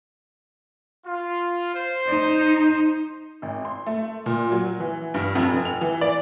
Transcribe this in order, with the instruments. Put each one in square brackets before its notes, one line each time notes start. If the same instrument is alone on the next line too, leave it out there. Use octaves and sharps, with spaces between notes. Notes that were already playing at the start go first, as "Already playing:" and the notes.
[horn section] F4
C5
[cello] D#4
[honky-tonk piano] G#1
C6
A3
A#2
F#3
E3
G2
F2
F1
F7
E3
D5